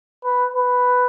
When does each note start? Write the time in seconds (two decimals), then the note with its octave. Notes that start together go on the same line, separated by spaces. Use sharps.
0.25 B4
0.54 B4